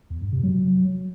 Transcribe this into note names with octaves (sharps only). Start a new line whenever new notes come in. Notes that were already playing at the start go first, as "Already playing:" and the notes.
E2
G2
C3
F#3